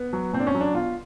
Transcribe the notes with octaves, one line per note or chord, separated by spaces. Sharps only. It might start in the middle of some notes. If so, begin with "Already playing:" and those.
Already playing: B3
F#3
A#2 C4
D4
C#4
F#3
D4
B2 F4